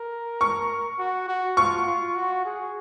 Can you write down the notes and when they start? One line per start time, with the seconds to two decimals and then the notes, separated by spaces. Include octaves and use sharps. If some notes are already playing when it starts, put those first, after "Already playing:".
Already playing: A#4
0.41 C#6
0.99 F#4
1.28 F#4
1.57 F4 C#6
1.86 F4
2.15 F#4
2.45 G#4